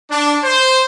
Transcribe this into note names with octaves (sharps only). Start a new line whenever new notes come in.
D4
C5